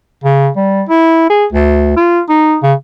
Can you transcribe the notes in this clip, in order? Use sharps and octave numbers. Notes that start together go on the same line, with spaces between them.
C#3
G3
E4
G#4
D2
F4
D#4
C#3